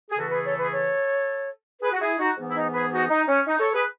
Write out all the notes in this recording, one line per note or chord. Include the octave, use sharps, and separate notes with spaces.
G#4
E2 C#3 E3 A3 F#4 A4
G#4 B4
A4 C#5
G#4 B4
A4 C#5
G#4 B4
F#4
E4 G#4
D#4 F#4
G#2 E3 B3
E4
D#4
G#4 B4
D#4 F#4
D#4
C#4
D#4
A4 C#5
G#4 B4